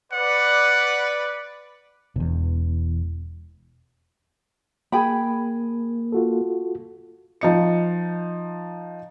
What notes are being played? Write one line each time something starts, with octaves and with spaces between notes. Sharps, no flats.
B4 D5 F#5
E1 E2
A#3 G#4 G5 B5
F4 F#4 A4
F3 D#4 C#7